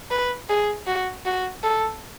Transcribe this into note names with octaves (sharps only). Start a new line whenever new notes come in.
B4
G#4
F#4
F#4
A4